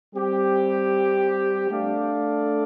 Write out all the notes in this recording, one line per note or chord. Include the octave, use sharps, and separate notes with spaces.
G3 C4 G4
A3 D4 A4 D5 F5